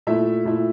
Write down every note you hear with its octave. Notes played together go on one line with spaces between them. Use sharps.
A#2 A3 E4 E5
A#2 A3 E4